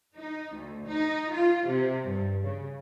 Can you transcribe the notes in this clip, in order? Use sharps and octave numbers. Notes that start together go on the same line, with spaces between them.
D#4
D2
D#4
F4
C3
G2
C#3